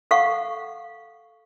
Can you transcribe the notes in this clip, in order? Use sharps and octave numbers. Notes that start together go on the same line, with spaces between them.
A4 F5 F#5 C#6